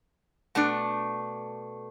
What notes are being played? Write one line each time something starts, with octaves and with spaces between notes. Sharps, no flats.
B2 A3 D4